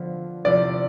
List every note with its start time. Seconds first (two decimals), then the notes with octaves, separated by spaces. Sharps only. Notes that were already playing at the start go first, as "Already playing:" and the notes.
Already playing: D3 F3 B3 F4
0.45 C3 F3 C4 E4 A4 D5